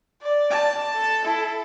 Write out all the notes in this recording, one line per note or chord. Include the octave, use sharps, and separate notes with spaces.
D5
A5
A4
E4